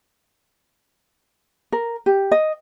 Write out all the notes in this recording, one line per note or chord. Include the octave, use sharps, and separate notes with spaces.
A#4
G4
D#5